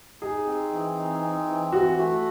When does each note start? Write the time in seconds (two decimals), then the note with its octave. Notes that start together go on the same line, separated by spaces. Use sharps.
0.22 D#4 G#4
0.47 C4
0.72 E3
0.97 D#4
1.22 C4
1.47 E3
1.73 E3 F#4
1.98 A3